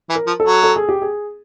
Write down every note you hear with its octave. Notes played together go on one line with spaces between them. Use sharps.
E3
A#4
F3
A4
F#3
A4
G#4
G4
G#4